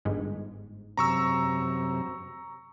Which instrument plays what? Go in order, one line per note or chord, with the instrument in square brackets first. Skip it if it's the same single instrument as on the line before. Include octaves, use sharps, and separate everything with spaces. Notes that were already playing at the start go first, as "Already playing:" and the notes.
[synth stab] G1 G#2
[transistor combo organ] F#2 C3 [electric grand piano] A#5 C#6 E6